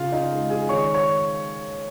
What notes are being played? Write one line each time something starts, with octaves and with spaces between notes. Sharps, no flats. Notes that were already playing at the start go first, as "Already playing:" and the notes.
Already playing: C#3 F4 F5
D#4 D#5
G#3
G#4 G#5
D#3 C#5 C#6
C#5 C#6